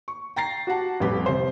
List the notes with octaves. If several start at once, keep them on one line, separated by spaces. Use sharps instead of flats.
C#6
G5 A#5 A6 C7
F#4 G4 F#5 A5
A1 F2 G3 G4 B4
C3 C5